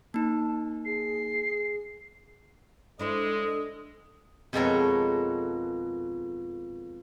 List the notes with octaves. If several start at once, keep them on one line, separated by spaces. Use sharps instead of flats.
A#3 D#4 A5
G#4 C7
G#3 D4 E4 A4 C5 D#6
F2 B2 G#3 A4 A#4 C#5